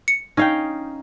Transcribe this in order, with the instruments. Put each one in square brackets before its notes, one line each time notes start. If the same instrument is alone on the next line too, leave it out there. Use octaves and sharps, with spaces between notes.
[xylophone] C#7
[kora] C#4 F5 G5 [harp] D#4